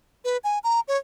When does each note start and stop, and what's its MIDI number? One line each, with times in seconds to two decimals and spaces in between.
0.24 0.37 71
0.44 0.59 80
0.64 0.80 82
0.88 0.97 73